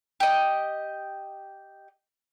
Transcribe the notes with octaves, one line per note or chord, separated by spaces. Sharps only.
G4 D#5